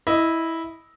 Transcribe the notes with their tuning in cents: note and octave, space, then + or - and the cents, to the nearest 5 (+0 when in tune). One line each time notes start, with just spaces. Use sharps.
E4 -10 D#5 +0